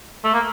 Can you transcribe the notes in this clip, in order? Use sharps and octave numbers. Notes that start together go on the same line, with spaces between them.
A3
A#3